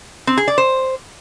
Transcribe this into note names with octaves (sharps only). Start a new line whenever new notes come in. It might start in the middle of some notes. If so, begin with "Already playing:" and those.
C4
G#4
D5
C5